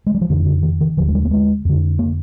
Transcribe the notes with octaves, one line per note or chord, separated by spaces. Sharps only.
G#3
G3
F3
F2 D3 D#3
D3
D#3
D#3
D#2 D3 F3
G#3
G3
A#3
G#3
F2 D3
A#3